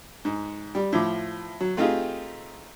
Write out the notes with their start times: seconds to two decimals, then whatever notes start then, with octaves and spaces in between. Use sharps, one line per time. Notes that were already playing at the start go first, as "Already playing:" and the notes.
0.25 G#2
0.75 G3
0.93 A2 F3 D6
1.60 F#3
1.77 A3 C4 D#4 F4 G4 G#4